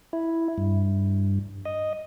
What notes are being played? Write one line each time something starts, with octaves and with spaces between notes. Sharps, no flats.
E4
G2
D#5